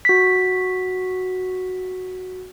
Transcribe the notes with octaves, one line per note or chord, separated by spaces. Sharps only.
F#4 B6